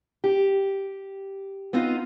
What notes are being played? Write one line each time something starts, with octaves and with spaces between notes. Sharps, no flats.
G4
B3 C4 D#4 F4